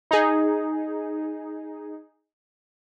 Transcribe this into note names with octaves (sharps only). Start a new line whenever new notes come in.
D#4 G#4